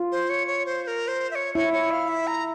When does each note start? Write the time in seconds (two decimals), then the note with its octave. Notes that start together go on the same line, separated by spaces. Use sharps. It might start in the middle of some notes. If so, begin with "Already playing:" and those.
Already playing: F4
0.12 C5
0.30 C#5
0.47 C#5
0.66 C5
0.84 C5
0.87 A#4
1.08 C5
1.31 E5
1.35 C#5
1.55 E4 C#5
1.73 C#5
1.91 F5
2.09 E5
2.27 A#5